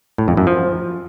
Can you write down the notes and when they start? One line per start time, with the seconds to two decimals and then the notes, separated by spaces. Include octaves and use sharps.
0.18 A2
0.28 F2
0.37 F#2
0.47 F3